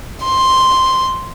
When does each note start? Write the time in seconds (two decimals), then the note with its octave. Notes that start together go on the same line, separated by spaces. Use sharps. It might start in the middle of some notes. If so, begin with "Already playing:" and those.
0.25 C6